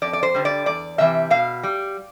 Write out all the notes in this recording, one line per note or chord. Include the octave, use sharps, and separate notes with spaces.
F2 D5
D5
C5
D3 G3
D5
E2 D5
C3 E3 G3 E5
B2 F5
G3